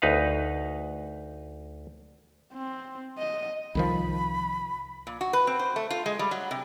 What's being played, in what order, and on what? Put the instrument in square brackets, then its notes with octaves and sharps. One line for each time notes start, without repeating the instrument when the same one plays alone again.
[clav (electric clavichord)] D2 D#4 B4 F5
[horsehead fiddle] C4
D#5
[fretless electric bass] C2 D#3 F3 [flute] B5
[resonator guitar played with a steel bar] A#2
F#4
B4
C4
C5
A3
F4
G#3
G3
F#3
C3